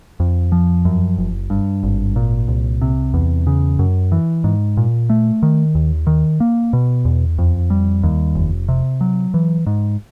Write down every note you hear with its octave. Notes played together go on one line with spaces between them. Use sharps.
F2
F3
F#2
F#1
G2
G#1
A#2
C2
C3
E2
C#3
F#2
E3
G#2
A#2
A3
D#3
D#2
D#3
A#3
B2
E2
F2
G3
D#2
F1
C3
F#3
E3
G#2